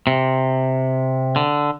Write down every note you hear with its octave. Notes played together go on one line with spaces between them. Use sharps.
C3
D3